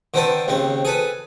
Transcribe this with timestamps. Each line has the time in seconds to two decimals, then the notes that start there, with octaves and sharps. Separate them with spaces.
0.14 D3 D#3 C4 B4 A5
0.48 D#2 C#3 C4
0.85 G#4 A4 B4